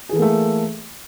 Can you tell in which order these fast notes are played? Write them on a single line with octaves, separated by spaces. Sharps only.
G#4 E3 A4 A#3 A3